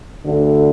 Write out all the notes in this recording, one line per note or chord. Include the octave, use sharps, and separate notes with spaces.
D2 D3